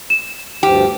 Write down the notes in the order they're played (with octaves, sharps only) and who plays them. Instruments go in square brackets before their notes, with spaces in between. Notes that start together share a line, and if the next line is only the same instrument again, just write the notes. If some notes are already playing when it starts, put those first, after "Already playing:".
[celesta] E7
[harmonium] D2 G2 F3 [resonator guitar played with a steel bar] G4